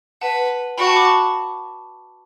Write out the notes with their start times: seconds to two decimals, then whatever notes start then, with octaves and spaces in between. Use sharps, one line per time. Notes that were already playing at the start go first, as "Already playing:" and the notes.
0.21 B4 F#5 A5
0.77 F#4 G5 B5
0.87 A5 C#6
0.96 B5 D6
1.05 A5 C#6